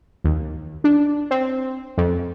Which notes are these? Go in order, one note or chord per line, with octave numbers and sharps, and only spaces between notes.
D#2
D4
C4
F2